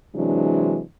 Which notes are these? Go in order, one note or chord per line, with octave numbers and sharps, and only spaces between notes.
C3 E3 F#3 G#3 D4